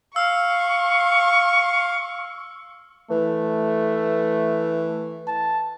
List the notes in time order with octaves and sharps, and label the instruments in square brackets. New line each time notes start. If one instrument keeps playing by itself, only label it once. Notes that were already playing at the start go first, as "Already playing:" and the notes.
[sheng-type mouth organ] F5 [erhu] C#6 [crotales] E6
[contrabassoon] E3 [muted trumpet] A3
[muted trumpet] A5